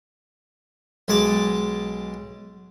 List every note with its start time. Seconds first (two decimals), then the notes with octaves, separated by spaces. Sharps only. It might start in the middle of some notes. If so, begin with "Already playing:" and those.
1.08 B1 G#3 A5 D6